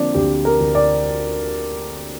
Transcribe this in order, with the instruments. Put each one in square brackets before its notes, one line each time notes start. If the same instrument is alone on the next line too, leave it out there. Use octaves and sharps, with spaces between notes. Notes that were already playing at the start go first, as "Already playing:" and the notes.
Already playing: [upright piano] D3 F3 A#3 C4 D4
D2 G4
A#4
D2
D5